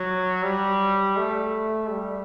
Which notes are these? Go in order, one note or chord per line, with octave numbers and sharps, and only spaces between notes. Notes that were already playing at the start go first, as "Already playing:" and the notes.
Already playing: F#3
G3
A3
G3